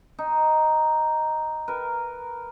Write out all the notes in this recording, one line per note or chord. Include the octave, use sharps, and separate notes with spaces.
D#4
A#4 B4